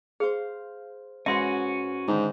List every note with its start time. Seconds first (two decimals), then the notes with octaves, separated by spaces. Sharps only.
0.20 G#4 C5 F5
1.26 G#2 C#4 F#4 B4 E5 G#5 C6
2.08 G#2 D3 D#3 C#4